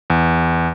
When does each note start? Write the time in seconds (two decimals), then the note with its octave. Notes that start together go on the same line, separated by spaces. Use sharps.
0.10 E2